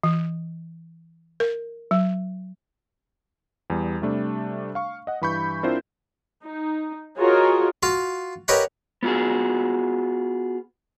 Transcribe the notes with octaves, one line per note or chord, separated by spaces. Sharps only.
E3
A#4
F#3
E2 G3
C3 G3 A3 D4
F5 C#6
D#5 F#5
G2 E3 B5 C#6 G6
C4 D4 E4 F4 A#4 C5
D#4
F4 F#4 G#4 A#4 C#5 D#5
F4 F#4 F5
G4 A#4 B4 C#5 D#5 F#5
B3 F4 F#4 G#4